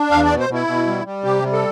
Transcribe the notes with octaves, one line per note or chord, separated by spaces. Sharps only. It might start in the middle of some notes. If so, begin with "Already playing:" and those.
Already playing: D4
E2 F5
D5
B2
C5
B2 E4
B2
G3
G3
C3 G4
G3
A4